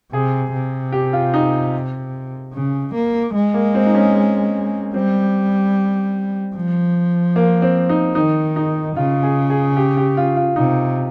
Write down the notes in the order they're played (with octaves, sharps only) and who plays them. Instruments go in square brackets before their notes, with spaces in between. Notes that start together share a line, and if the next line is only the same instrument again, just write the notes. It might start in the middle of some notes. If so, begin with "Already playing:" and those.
[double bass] C3 [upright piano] G#4
[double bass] C3
[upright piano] G4
F4
D#4
[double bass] C#3
A#3
G#3
[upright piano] A#3
C4
D#4
C#4
[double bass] G3 [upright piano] C4
[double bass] F3
[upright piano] A#3
C4
D#4
[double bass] D#3 [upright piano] D#4
[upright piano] D#4
[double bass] C#3 [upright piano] F4
[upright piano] G#4
G#4
G4
G4
F4
F4
[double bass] C3 [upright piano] D#4